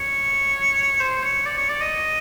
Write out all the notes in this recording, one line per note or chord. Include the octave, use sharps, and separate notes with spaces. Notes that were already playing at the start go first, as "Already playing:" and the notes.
Already playing: C#5
C5
C#5
D5
C#5
D5
D#5